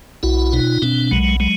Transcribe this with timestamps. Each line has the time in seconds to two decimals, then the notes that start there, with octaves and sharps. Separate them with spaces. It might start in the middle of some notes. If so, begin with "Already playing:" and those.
0.23 B1 E4 F#4
0.53 B2 D#4 F4
0.82 B2 C4 D4
1.11 B1 F#3 G#3
1.40 F#3 G#3